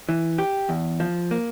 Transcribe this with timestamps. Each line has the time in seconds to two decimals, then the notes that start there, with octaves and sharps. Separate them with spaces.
0.09 E3
0.38 G4
0.69 E2
1.00 F3
1.31 A#3